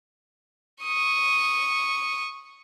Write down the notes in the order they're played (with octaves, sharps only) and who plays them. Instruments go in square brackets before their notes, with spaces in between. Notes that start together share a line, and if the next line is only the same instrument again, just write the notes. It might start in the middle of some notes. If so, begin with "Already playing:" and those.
[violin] C#6 D#6